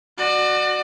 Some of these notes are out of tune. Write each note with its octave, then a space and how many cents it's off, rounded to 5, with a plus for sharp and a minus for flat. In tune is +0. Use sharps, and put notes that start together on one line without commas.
F#4 +0 D5 +30